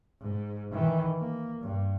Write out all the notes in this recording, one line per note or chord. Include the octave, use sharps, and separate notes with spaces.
G#2
D#3 E3
A#3
G2